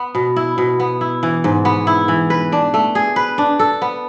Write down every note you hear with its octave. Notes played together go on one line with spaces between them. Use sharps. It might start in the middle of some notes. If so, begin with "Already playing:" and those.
Already playing: B3
B2
E4
B2
B3
E4
E3
G#2
B3
E4
E3
B4
D4
A3
G#4
B4
D4
A4
B3